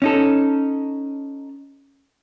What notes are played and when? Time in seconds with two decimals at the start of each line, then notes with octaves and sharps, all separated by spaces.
0.02 C#4 D#4 A4